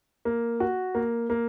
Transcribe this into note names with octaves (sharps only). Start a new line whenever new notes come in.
A#3
F#4
A#3
A#3